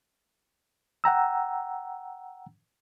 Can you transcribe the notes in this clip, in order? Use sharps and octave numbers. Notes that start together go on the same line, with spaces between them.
F#5 G5 A#5 E6